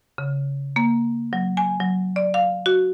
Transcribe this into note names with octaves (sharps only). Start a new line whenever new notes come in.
C#3
A#3
F#3
G#5
F#3
D5
F5
F#4